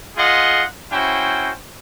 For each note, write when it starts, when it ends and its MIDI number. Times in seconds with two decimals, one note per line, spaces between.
0.17 0.63 65
0.17 0.63 68
0.17 0.63 75
0.17 0.63 78
0.17 0.63 84
0.92 1.51 61
0.92 1.51 64
0.92 1.51 66
0.92 1.51 72
0.92 1.51 79